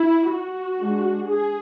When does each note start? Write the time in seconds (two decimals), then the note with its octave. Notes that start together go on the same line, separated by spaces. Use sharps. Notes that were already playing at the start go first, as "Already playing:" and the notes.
Already playing: E4
0.31 F#4
0.80 G#3 D4
1.29 G#4